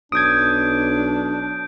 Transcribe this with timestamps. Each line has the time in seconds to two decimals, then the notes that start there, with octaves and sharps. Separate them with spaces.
0.12 B1 D4 D#6 G6 G#6 D7